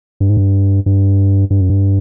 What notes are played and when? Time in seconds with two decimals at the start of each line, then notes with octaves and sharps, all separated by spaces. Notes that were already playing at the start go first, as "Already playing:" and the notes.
0.20 G2
0.30 G#2
0.37 G2
0.86 G2
1.50 G2
1.61 F#2
1.70 G2